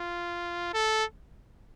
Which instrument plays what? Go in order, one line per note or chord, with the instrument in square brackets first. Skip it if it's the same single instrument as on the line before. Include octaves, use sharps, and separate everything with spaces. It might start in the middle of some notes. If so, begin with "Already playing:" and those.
Already playing: [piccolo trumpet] F4
A4